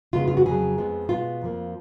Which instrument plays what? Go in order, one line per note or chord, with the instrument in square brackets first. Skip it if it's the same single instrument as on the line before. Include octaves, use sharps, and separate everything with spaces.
[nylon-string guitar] F2 C#3 G#3 B3 F4
F4
F#4
F2 C#3 F#3 G#4
F2 F3 G#3 B3
B2 G#3 B3 F4
F2 F3 A#3